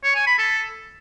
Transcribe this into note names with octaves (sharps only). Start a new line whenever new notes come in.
C#5
G#5
B5
A4